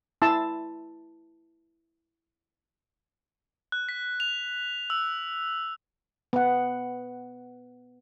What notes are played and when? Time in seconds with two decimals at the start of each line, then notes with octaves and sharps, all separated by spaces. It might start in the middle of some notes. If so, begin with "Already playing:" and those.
0.22 E4 A5 C6 E6
3.72 F#6
3.89 B6
4.20 F7
4.90 E6
6.33 B3 F#5